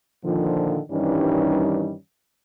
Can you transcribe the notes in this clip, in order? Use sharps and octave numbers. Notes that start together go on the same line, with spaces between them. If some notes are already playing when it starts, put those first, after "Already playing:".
A#2 D3 D#3 F3
G2 D#3 E3 G3 C#4 D#4